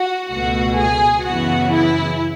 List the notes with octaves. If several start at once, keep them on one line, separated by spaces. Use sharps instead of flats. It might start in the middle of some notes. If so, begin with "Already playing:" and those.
Already playing: F#4
C#2 B2 A3 F#4
G#4
F#2 C#3 E3 B3 F#4
E4